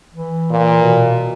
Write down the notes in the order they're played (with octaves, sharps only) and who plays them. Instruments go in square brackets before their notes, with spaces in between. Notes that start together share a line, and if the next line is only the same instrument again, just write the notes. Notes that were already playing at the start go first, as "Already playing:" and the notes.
[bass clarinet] E3
[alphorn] A#2
[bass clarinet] B2